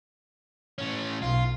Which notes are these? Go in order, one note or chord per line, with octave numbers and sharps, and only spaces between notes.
A2 C#4
B1 F4